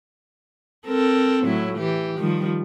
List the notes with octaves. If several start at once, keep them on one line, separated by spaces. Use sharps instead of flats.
C4 A4 A#4
A2 F#3 E4
E3 G4
D#3 F3 G3